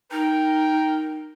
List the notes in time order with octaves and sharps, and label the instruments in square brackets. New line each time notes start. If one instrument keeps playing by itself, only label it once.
[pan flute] D#4 [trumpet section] A#4 G5